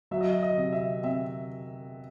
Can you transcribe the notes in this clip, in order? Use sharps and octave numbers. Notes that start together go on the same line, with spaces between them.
F#3 E5
D#5
E5
D#5
C3
E5
C4 E5